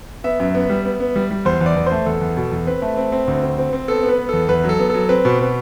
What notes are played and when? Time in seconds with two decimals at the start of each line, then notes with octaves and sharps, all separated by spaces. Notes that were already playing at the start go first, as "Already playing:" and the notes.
0.24 B3 E5
0.40 F#2
0.55 B3
0.69 G3
0.85 B3
1.00 B3
1.16 G3
1.31 G3
1.45 E2 C5
1.61 E2
1.66 D5
1.76 E2
1.86 A3 C5
2.06 E2 A4
2.21 E2
2.37 B2
2.52 E2
2.67 C4 B4
2.82 A3
2.97 C4
3.12 C4
3.28 D2
3.43 C4
3.58 C4
3.73 C4
3.88 B3 A4
4.03 B3
4.09 B4
4.18 B3
4.29 E2 A4
4.49 E2 B4
4.64 F#3
4.69 A4
4.79 B3
4.90 F#3 A4
5.09 C4 B4
5.25 B2
5.40 B2